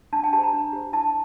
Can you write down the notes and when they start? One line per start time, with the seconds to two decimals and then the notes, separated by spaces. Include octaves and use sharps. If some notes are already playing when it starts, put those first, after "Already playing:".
0.13 D4 A5
0.24 G5
0.33 G4 C5 A5
0.43 A#5
0.53 D4
0.73 G4 C5
0.93 E4 A5